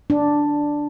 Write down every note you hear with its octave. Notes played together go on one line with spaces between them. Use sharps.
D4